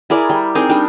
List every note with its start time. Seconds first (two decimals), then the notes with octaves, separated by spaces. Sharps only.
0.10 E4 G#4 A#4 D5
0.29 G3
0.55 C4 D#4 G#4 A#4
0.69 G3 D4 D#4